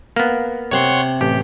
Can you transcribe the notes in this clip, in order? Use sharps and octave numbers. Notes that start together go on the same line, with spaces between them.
A#3 B3
C3 C4 C#5 F#5 C6
A1 G4